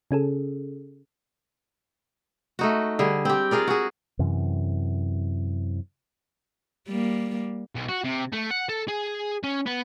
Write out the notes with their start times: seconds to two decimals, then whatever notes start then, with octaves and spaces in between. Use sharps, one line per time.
0.11 C#3 C#4 G#4 A4
2.59 A3 D#4 F#4
2.99 D3 G3 G#4
3.25 C4 G4
3.51 F4 G#4 A#4 D5
3.68 F#4 G#4
4.19 F#2 C3 E3
6.88 G3 A#3
7.75 B1
7.89 F#4
8.04 C3
8.33 A3
8.51 F#5
8.69 A4
8.88 G#4
9.44 C#4
9.66 B3